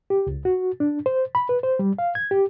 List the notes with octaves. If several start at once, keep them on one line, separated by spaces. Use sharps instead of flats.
G4
C#2
F#4
D4
C5
B5
B4
C5
G3
F5
G#6
G4